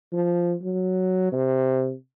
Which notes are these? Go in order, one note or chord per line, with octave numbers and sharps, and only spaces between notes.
F3
F#3
C3